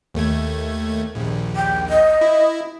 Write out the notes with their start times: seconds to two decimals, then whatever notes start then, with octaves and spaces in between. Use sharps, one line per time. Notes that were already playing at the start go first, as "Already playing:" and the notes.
0.14 D#2 A3 G#6
1.15 A#1 D#2
1.56 G5
1.90 D#5
2.21 E4